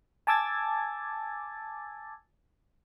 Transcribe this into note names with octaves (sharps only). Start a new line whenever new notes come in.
G#5 A5 D6 E6 G#6 A6